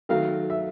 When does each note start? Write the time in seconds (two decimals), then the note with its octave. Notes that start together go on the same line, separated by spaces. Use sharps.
0.09 D#3 F#3 A3 F5
0.50 E5